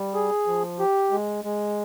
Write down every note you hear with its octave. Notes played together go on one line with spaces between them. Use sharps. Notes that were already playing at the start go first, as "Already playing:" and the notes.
Already playing: G3
G#4
F3
G4
G#3
G#3